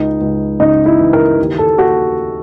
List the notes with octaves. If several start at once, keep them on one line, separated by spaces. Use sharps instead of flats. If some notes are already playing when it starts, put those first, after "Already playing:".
Already playing: C#2 D#4
C#2
C#3 D#4
E4
E3
A#4
D#2
A4
D#2 F#4